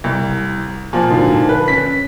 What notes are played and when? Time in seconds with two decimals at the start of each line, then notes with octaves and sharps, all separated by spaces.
0.04 C2
0.93 A#2 F3
1.10 G#2 D3 F#3
1.49 B4
1.68 C#4 B6